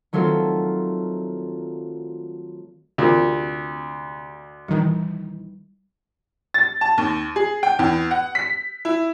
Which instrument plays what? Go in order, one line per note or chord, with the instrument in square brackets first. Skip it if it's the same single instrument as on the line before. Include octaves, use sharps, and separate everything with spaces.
[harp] D#3 F#3 A3 C4 F4
[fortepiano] D2 [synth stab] C3 [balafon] F4 A#4
[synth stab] A#1 D#3 E3 [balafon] G3
[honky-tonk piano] A6
A5
D#2
G#4
G5
E2
F#5
B6
E4